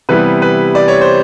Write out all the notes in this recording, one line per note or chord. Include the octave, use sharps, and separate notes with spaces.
C3 E3 G3 B3 B4
B4
D5
C#5
C5